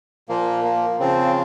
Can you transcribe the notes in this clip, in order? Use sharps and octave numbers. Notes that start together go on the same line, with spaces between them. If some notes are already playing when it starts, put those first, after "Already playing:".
A#2 F3 A#3
A#3
C#3 F3 C4